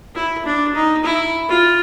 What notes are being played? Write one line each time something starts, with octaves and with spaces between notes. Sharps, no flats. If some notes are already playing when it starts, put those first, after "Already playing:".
E4
D4
D#4
E4
F4